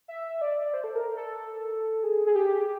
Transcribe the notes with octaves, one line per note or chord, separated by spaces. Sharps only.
E5
D5
C5
A4
A#4
A4
G#4
G#4
G4